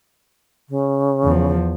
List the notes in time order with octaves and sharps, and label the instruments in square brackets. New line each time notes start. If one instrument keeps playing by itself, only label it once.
[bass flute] C#3
[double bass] E2 F3